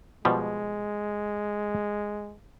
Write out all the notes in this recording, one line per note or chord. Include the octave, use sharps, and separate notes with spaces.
B2 F3 G3 G#3